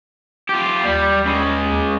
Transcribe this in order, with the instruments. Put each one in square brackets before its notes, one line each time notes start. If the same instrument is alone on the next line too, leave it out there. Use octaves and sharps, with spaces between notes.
[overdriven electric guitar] F4 G4
[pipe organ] D#2 [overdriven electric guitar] G3
[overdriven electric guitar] C#3 G#3